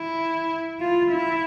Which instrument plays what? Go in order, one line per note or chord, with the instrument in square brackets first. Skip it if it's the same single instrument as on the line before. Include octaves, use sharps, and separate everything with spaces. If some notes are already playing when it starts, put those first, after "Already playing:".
Already playing: [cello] E4
F4
E4